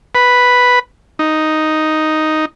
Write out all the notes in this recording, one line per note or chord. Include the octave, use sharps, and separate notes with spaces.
B4
D#4